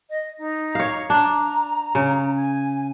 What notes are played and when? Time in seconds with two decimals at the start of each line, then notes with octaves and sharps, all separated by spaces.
0.10 D#5
0.38 D#4
0.75 C#5 F5
1.10 D4 A#5
1.95 C#3
2.35 G#5